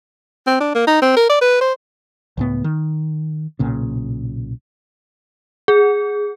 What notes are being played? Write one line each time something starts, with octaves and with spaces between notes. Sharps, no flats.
C4
D4
A#3
D#4
C4
A#4
D5
B4
C5
C#2 A2 B3
D#3
B1 A#2 C#3
G#4